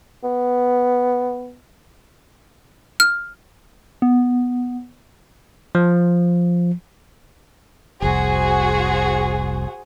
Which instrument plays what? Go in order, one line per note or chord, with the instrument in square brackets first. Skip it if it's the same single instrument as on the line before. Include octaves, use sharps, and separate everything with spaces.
[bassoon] B3
[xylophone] F6
[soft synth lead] B3
[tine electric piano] F3
[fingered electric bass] F1 C2 [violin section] F#4 G#4 C5